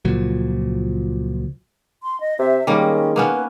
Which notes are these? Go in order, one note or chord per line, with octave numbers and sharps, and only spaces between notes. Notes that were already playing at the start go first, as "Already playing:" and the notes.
C#2 A#2 F3 F#3
C6
D#5
C3 E5
D#3 G3 G#3 A#3 C#4
A#3 B3 C#4 B4